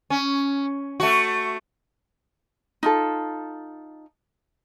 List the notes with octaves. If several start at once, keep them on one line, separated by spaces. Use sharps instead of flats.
C#4
A3 F#4
D#4 F4 A4